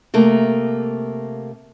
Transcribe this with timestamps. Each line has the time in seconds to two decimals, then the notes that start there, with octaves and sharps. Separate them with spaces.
0.14 C3 A3 A#3